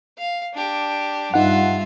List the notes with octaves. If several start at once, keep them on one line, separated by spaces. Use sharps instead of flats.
F5
D4 G4
G2 D#4 F4 E5 F#5